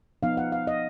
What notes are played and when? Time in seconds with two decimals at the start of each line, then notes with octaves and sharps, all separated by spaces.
0.23 F3 B3 D#4 F5
0.37 F#5
0.52 F5
0.67 D#5